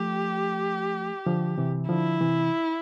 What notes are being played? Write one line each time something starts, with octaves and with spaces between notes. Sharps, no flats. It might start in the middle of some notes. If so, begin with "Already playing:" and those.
Already playing: F3 A3 G4
D3 F3
C3 E3
D3 F3 E4
C3 E3